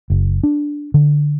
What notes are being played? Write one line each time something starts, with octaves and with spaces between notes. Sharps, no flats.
F#1
D4
D3